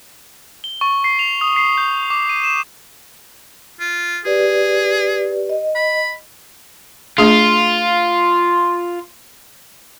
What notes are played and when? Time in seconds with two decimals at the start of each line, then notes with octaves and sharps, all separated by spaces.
0.64 G7
0.81 C#6
1.04 C7
1.19 F7
1.41 D#6
1.56 C7
1.78 G6
2.10 D6
2.29 D#7
2.43 E7
3.80 F4
4.25 G4 G#4 B4 D5
5.49 D#5
5.75 B5
7.18 A3 D4 F4 G#4